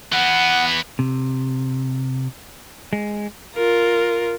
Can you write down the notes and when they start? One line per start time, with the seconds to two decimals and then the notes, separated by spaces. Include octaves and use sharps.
0.12 E3 B3 F#5
0.99 C3
2.93 G#3
3.54 F4 A#4